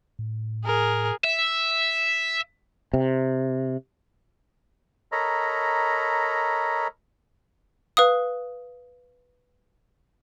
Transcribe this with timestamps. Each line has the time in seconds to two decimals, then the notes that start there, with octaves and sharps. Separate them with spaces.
0.19 A2
0.65 G#4 A#4
1.24 E5
2.94 C3
5.12 A4 A#4 C#5 D#5 A#5 B5
7.97 B4 F5 D#6